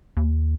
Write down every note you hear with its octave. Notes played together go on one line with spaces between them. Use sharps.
D#2